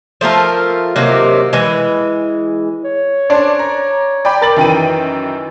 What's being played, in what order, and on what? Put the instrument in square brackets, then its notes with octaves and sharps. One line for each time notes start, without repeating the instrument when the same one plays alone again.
[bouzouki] F3 A3 F4 A#4
C3 D#3 F#3 A#3
E3 G#3
[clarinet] C#5
[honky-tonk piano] C#4 D4 C5 [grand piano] D5
[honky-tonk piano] A#5
D5 G5 B5
[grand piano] A#4 A6 F#7
[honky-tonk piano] F#2 G5 D#7 [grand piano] D#3 E3